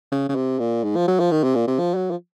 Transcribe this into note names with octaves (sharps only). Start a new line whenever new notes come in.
C#3
C#3
C3
A#2
G#2
F3
F#3
F3
D#3
C3
A#2
C3
F3
F#3
F3